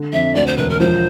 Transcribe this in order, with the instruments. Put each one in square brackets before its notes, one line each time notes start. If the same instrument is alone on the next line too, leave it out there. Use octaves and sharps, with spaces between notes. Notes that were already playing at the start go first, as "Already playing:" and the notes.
Already playing: [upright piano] D3
[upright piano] F2 [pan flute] E5
[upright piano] D2 [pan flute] D5
[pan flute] C5
[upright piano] E1 [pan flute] B4
[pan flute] A#4
[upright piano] F3 [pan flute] C5